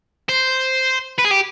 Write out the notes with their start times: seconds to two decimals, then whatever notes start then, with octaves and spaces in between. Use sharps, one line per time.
0.29 C5
1.19 B4
1.25 G#4
1.31 G4